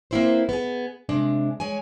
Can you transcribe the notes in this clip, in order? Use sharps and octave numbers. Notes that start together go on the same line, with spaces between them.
A#3 C4 D4 E4 B4 C5
B3 G#4
C3 G#3 D4
G#3 C#5 G#5